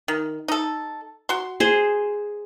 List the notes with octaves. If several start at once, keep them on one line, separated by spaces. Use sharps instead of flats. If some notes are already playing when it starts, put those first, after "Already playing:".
D#3
D#4 A4
F#4 C6
G#4 C5